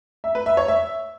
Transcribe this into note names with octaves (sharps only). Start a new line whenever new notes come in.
E5
B4
E5
C#5
E5